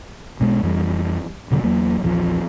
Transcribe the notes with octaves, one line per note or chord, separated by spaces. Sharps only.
B1 B2 F#3 G#3
F2 E3 G3
E2 B2 D3 G3
E2 F#3 A#3
A#1 E2 E3 F3